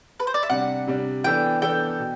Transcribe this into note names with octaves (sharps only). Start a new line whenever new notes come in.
B4
C5
D5
E5
C3 G3 D4 F#5
C3 G3 D4
E3 B3 D4 A4 G5
E3 B3 D4 A4 G5
B2